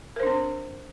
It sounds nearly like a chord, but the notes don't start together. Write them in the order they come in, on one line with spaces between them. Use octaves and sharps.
A#4 C5 D4 C4